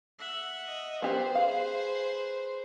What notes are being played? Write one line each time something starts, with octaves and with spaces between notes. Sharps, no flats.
E5 F#5
D#5
B3 G4 B4 C5
G#4 B4 F5